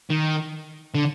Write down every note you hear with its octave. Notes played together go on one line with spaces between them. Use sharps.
D#3
D3